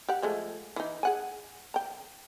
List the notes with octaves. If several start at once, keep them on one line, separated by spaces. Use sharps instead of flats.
G4 F#5
F3 G#3 A3
E3 D#4
G#4 F#5 G#5
G5 A#5